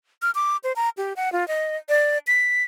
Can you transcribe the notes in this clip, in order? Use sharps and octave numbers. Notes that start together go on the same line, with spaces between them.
F6
D6
C5
A#5
G4
F#5
F4
D#5
D5
B6